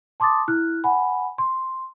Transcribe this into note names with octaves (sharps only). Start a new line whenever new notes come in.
A5 C6 D6 D#6 A6
E4 F6 F#6
F#5 G#5 B5
C6